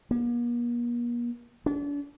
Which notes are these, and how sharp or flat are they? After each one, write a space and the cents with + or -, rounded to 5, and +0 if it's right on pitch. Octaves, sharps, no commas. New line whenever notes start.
A#3 +45
D4 -40